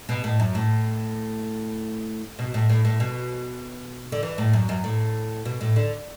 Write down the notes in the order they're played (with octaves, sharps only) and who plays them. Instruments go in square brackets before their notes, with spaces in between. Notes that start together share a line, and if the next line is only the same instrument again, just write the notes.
[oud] B2
A2
F#2
A2
B2
A2
A2
A2
B2
D3
E3
A2
F#2
F#2
A2
B2
A2
D3